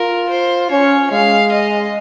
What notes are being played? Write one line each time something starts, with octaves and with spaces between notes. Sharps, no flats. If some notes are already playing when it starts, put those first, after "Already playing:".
Already playing: F4 A#4
C5
C#4 C#5
G#3 F5
D#5